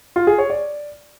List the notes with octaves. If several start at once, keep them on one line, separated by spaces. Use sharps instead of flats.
F4
G#4
C#5
D5